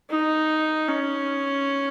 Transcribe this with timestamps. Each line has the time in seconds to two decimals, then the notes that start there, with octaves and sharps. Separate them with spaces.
0.10 D#4
0.88 C#4